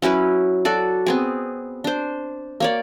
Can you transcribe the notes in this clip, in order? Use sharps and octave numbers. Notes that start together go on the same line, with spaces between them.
F#3 C#4 E4 B4
F#4 A4 D5
B3 C4 G#4
D4 C5
A#3 C#5 D5